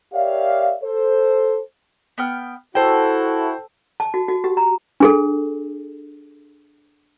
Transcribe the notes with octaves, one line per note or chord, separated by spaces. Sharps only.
G4 A#4 C#5 D5 E5 F5
A4 C5
B3 G5 F6
E4 F#4 A4 C5 G5
A5
F#4
F#4
G4
A#5
D4 G#4 A4